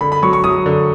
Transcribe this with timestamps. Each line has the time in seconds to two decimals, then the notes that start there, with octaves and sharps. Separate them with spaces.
0.01 D3 B5
0.12 B5
0.22 F#3 C#6
0.33 C#6
0.44 F#3 D#6
0.66 D3